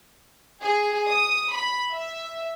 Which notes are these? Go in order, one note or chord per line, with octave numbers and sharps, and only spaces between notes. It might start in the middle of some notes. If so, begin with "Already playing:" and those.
G#4
D#6
B5
E5